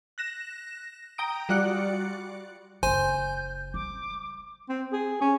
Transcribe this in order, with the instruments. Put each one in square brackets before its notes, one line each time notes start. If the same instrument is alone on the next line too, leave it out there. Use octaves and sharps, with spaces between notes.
[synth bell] F#6 A#6 E7
G5 A#5 D#6 D7
G3 F4 F#4 D5 F#6 C#7
[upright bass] F#1 F4 [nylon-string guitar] C5 [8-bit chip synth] G#5 [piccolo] G6
[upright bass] G3 [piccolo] D6
[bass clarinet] C4
G#4
C#4